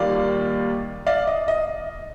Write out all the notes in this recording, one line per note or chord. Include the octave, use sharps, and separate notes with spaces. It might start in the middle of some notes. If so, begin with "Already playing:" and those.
Already playing: D#2 D#3 G3 A#3 F4 D5 F5
D5 F5
D#5
D#5